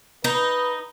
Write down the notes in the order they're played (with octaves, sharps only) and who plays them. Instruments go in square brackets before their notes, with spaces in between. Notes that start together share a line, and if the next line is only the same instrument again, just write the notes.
[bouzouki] D#4 [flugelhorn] B4